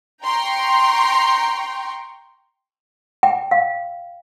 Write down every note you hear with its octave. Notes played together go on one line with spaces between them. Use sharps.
G5 A#5 C6 C#6
G5
F5